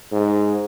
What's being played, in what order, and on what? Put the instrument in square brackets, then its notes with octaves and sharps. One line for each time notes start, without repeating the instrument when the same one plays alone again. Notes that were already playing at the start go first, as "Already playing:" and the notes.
[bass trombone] G#2